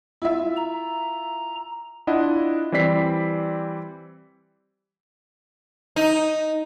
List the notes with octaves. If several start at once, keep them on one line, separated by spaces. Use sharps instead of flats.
E4 F4 E5
A#5
D4 E4 F4 D#5 F#5
E3 G3 C4 D5 B6 C7
D#4